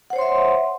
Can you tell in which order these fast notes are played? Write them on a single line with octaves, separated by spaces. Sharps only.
F#5 C5 C#5 C6 E5